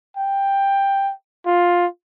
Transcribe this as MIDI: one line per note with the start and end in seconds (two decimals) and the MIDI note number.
0.17 1.12 79
1.46 1.86 65